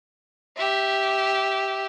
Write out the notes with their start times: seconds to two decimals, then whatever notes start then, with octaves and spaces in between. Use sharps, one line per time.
0.57 G4 E5